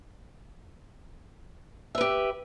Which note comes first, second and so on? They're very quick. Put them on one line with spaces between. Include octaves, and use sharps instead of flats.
E5 B4 G4